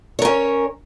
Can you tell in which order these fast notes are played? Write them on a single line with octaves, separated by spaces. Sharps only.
C#5 A#4 C#4